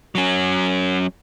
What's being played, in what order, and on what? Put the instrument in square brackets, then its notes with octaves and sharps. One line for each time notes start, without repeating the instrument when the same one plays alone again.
[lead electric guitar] F#3 C#4